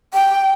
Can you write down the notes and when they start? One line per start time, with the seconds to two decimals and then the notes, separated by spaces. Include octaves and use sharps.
0.14 G5